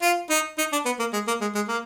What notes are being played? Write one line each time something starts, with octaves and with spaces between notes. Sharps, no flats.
F4
D#4
D#4
D4
B3
A#3
G#3
A#3
G#3
G#3
A#3